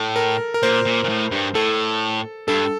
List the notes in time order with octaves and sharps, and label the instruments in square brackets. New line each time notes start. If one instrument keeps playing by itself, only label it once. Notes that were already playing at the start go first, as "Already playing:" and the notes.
Already playing: [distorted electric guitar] A2 [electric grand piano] A4
[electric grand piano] A#4
A#4
[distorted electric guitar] A#2 [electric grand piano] C5
[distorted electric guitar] A#2
A#2
A2
G2
[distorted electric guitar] A2 [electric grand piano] A4
[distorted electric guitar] G2 [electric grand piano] A4